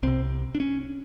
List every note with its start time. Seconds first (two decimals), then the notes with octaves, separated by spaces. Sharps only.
0.03 C2 C3 C4
0.55 D4
0.60 C#4